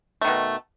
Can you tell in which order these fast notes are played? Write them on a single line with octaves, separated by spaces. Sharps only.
A3 D#3 B2